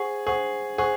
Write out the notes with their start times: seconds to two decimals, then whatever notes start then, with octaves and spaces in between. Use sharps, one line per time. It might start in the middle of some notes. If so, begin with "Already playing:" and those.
Already playing: G#4 C5 F#5 C#6
0.27 G#4 C5 F#5 C#6
0.78 G#4 C5 F#5 C#6